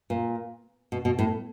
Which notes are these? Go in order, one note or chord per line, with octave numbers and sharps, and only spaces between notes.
A#2
B2
B2
A2